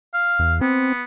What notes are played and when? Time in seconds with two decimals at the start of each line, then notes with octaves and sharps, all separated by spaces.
0.14 F5
0.39 E2
0.61 B3 C4